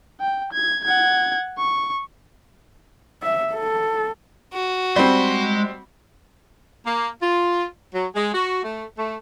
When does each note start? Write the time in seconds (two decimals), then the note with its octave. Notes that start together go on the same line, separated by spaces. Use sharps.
0.20 G5
0.53 G#6
0.85 F#5 G#6
1.58 C#6
3.22 E5
3.53 A4
4.53 F#4
4.96 G3 G#3 C4 C6
6.86 A#3
7.22 F4
7.94 F#3
8.15 G#3
8.34 F#4
8.63 A3
8.98 A3